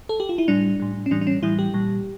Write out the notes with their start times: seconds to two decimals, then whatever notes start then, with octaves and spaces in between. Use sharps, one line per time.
0.09 A4
0.20 G4
0.29 F4
0.38 E4
0.48 A2 G3 D4
0.80 A2 G3
1.06 C#4
1.11 A2 E3 G3 D4
1.21 D4
1.27 C#4
1.42 A2 E3 G3 E4
1.59 G4
1.74 A#2 G3